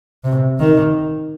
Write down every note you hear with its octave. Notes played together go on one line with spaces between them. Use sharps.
C3
D#3